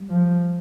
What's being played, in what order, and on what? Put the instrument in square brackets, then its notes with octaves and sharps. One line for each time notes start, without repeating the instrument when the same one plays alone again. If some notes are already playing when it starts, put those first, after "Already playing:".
Already playing: [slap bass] G3
[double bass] F3